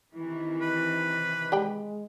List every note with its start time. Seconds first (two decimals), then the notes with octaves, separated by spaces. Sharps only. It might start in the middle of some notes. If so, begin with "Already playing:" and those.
0.14 C3 D#3 E3 E4
0.61 B4
1.52 G#3 G4 G5 B5